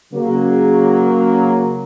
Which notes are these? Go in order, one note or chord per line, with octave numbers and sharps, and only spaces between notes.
C#3 F#3 A#3